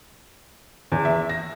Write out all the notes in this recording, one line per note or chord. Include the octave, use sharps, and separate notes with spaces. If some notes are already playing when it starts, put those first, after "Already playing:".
E2
E5
A#6